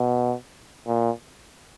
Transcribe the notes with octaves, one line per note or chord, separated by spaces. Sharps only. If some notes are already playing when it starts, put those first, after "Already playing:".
Already playing: B2
A#2